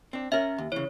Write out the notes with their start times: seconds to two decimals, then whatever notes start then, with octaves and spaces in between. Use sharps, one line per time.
0.13 C4 D4
0.32 C#4 A#4 E5
0.58 D#2
0.72 C#3 E3 C#5